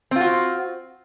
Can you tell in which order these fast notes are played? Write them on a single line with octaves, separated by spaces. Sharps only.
C4 F4 F#4